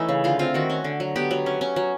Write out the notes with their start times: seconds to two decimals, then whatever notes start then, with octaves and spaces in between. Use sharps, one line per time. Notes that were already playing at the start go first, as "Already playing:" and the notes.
Already playing: E3 A3 C#4 D#4
0.09 C#3
0.24 D3 F4
0.39 C4 F4
0.54 D#3 F#4
0.70 C#4
0.84 D3
1.00 F#3
1.16 B3 G4
1.31 F#3
1.46 C#4
1.61 C#4
1.76 F#3